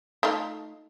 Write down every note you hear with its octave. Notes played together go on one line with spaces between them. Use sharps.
A3 D#4 F4